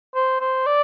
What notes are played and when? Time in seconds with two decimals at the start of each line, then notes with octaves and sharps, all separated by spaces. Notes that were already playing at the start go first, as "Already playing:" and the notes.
0.15 C5
0.40 C5
0.66 D5